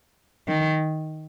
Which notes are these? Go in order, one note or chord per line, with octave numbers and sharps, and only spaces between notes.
D#3